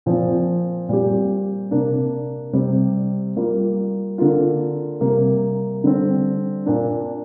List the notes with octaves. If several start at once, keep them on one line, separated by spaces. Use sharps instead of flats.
A#2 F3 C4
A#2 G3 C4 G4
C3 A#3 D4
C3 G3 C4
G3 A#3 F4
D3 A#3 F4
C3 G3 A#3
D3 G3 C4
A#2 A#3 D4